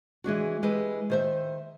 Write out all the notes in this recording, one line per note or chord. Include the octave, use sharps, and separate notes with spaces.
E3 G#3 D4 F#4
G#3 E4 G4 B4
D#3 C5 E5